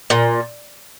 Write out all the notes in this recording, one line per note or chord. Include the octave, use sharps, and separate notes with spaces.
A#2